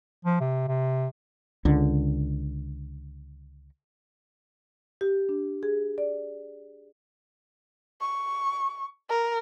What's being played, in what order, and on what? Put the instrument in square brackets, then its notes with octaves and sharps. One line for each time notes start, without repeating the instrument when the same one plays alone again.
[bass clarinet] F3
C3
C3
[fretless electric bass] C#2 D3
[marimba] G4
D4
G#4
D5
[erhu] C#6
A#4